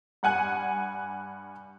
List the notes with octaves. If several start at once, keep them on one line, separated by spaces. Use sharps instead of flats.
G2 F#5 G#5 F#6